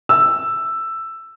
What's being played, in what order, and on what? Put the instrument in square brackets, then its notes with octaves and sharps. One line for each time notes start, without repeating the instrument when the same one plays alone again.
[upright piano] E6